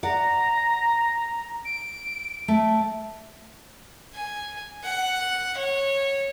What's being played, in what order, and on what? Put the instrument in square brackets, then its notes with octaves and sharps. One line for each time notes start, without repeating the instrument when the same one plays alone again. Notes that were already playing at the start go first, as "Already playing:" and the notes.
[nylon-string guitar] D5 F#5 [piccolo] A#5
[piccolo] D7
[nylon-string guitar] A3
[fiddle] G#5
F#5
C#5